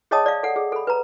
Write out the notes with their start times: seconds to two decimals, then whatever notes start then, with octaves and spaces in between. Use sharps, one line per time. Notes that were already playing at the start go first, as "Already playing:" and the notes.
0.11 G#4 C#5 D#5 G5 A5 D#6
0.26 D5 F5
0.43 A4 F#5
0.56 G#4
0.72 A4 B5
0.87 B4 A#5